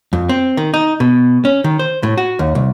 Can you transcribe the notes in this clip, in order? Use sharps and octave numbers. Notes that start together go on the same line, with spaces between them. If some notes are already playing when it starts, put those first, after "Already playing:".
F2
C4
D#3
D#4
B2
C#4
D#3
C5
A2
F#4
D#2
C2